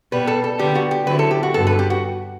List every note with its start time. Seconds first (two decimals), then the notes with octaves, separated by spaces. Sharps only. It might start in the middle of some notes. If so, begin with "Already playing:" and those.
0.12 B2 G3 B3 B4
0.27 A4
0.44 A4
0.59 D3 G3 B3 G4
0.75 F#4
0.91 G4
1.07 D3 F#3 C4 E4 B4
1.19 A4
1.31 G4
1.43 F#4
1.54 G2 D3 F#3 B3 A4
1.67 B4
1.79 G4
1.90 F#4